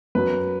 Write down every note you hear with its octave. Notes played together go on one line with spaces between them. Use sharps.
F#2 F#3 B4